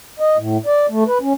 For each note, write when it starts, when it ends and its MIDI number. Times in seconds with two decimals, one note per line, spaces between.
0.20 0.37 75
0.37 0.57 45
0.66 0.86 74
0.89 1.04 57
1.07 1.18 71
1.22 1.33 61